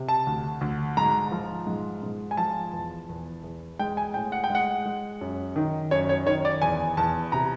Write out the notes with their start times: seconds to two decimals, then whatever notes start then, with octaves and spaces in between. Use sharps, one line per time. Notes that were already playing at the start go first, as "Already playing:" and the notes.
Already playing: C3
0.08 A5
0.27 D2
0.61 D2
0.97 G#2 A#5
1.32 F3
1.67 G#2
2.03 G#2
2.31 G#5
2.37 F3 A5
2.73 E2
3.09 E2
3.43 E2
3.79 G#3 G5
3.97 G#5
4.14 A2 G5
4.32 F#5
4.44 G5
4.50 G#3 F#5
4.85 G#3
5.21 F#2
5.56 D#3
5.91 F#2 C#5
6.09 C#5
6.26 D#3 C#5
6.45 D5
6.62 E2 G#5
6.97 E2 A5
7.32 C3 A#5